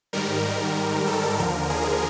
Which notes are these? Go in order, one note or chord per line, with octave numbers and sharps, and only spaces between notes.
G#2 D#3 G3 A#4
A#4
A4
D#2 D3 F3 A#4
G#4